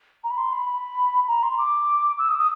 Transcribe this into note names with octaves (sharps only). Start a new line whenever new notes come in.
A#5
B5
C6
B5
A#5
C6
D6
E6
D#6
D#6